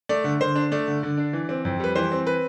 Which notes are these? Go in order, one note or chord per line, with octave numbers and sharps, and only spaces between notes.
A3 D5
D3
D3 C5
D4
A3 D5
D3
D3
D4
E3
C4
F2
G3 B4
E3 C5
C4
B4